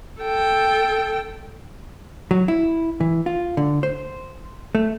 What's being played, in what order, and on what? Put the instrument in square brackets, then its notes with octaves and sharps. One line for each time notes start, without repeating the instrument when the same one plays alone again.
[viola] A4 G5
[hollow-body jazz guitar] F#3
E4
E3
F4
D3
C5
A3